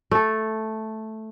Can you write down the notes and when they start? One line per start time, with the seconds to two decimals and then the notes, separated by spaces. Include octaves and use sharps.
0.11 A3 A4